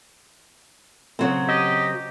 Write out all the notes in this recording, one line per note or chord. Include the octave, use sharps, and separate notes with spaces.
C#3 F#3 C4
G4 D#5